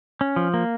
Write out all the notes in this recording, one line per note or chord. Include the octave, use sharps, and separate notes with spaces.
C#4
F3
A#3